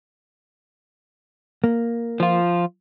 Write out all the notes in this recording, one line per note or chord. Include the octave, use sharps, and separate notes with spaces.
A#3
F3 F4